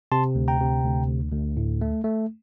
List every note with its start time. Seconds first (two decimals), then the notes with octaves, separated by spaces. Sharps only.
0.12 C3 A5 C6
0.35 D2
0.48 G5 A#5
0.60 C3
0.84 D2
1.08 D2
1.32 D2
1.57 A2
1.81 A3
2.04 A3